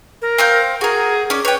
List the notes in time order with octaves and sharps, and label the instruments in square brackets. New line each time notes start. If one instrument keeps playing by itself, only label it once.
[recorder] A#4
[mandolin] C4 F5 G6
[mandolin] F#4 A#4 [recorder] G#4
[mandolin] C#4 D5
[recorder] B4 [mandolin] C#5 G5